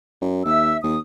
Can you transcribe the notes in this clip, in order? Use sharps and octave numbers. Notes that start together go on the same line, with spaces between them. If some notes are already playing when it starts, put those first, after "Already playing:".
F#2
D#2 E5 E6
D#2 D#6